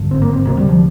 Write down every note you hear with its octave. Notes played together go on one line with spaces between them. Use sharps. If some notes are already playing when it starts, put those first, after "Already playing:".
Already playing: G#1 G2 D3
C4
A#3
C4
D2 C3 A#3
G3
F3